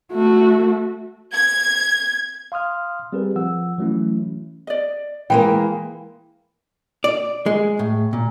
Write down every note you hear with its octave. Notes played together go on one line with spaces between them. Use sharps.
A3 F#4
G#6
F5 C6 D#6 F6
G3 C4 G4 G#4 A#4 B4
F3 F#5 E6
E3 F#3 A3 C#4 E4
D5 D#5
E3 G#3 A#3 G5
D5
G#3
A2
A#2